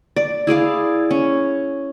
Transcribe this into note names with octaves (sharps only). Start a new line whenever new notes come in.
D5
E4 G#4 D5 F5
C#4